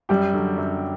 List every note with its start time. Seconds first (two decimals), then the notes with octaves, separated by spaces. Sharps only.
0.09 F#2 G3 G4
0.34 D3 F#3
0.58 F#2